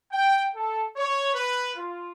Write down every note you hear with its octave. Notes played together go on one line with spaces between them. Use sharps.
G5
A4
C#5
B4
F4